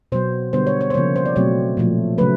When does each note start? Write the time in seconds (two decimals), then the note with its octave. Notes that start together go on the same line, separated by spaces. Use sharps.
0.12 B2 F#3 B3 C5
0.53 D3 G3 B3 C5
0.67 C#5
0.81 C#5
0.90 C5
0.94 C#3 F3 A#3 C#5
1.16 C5
1.26 D5
1.36 B2 F#3 A3 C4 C#5
1.77 A#2 F3 A3
2.18 C#3 F#3 A3 B4